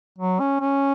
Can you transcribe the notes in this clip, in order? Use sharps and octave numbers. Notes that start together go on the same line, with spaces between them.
F#3
C#4
C#4